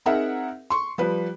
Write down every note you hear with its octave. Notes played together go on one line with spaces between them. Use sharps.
C4 D#4 G#4 A#4 E5 F#5
C6 C#6
F3 G3 B4